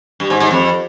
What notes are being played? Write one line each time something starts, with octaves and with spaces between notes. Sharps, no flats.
G2
G#2
G#2
F2